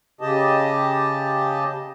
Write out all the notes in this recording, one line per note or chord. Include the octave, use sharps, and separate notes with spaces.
C#3 G4 D#5 A5